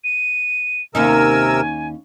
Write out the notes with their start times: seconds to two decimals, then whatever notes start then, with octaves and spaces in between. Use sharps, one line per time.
0.04 D#7
0.95 D#2 C3 C#4 D#4 A#4 G#5 E6